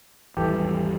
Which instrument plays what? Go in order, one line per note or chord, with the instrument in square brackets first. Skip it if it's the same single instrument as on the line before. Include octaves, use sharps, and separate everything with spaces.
[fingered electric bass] G#1 E2 G3 [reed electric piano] E3 G4 A4